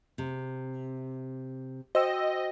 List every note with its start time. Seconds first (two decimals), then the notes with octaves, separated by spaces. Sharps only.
0.18 C3
1.95 F#4 C5 D#5 G5 E6